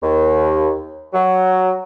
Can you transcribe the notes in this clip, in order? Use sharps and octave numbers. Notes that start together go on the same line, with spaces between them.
D#2
F#3